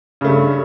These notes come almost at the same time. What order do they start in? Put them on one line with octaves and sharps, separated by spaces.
C#3 A3 G2